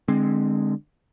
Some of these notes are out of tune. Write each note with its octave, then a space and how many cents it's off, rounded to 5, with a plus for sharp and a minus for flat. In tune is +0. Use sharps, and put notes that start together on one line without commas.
D3 +35 G#3 +0 C4 +0